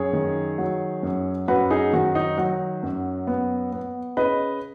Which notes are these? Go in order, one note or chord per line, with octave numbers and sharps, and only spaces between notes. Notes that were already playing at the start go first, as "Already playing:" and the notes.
Already playing: F#2 G#4 C#5
D#3
F#3
F#2
F#2 F#4 B4
D#4 G#4
D#3 F#4
D#4
F#3 F#4
F#2
B3
B3
C#3 B4 D#5